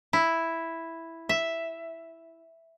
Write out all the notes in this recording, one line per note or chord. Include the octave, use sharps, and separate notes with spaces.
E4
E5